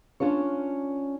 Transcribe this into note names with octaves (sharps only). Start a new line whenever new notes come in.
C#4 D4 F4 C#5